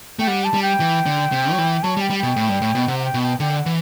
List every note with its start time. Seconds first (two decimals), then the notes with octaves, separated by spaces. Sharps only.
0.19 A3 G5
0.27 G3 F#5
0.44 A5
0.54 G3
0.62 G5
0.80 E3
1.06 D3
1.32 C3
1.52 F#3
1.58 E3
1.83 F#3 A5
1.97 G3
2.01 G5
2.10 G3
2.19 B2 G5
2.36 A2
2.49 G2
2.62 A2
2.75 B2
2.88 C3 F#5
2.99 F#5
3.05 G5
3.14 B2
3.23 G5
3.40 D3 G5
3.57 F#5
3.66 E3